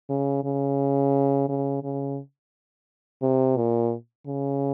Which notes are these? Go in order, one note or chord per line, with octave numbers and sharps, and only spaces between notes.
C#3
C#3
C#3
C#3
C3
A#2
C#3